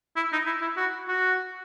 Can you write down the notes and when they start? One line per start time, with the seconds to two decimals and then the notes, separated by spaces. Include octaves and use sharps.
0.16 E4
0.32 D#4
0.46 E4
0.61 E4
0.77 F#4
1.07 F#4